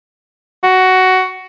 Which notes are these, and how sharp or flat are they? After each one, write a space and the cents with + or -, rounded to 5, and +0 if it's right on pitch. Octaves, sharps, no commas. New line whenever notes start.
F#4 +10